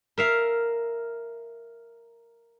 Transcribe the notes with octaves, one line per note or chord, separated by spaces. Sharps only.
A#4 E5 F5